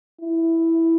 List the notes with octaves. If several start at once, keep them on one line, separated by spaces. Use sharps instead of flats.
E4